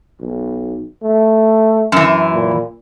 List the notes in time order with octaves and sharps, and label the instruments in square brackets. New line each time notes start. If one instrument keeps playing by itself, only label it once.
[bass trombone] B1
A3
[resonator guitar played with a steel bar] F#2 E3
[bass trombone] A#2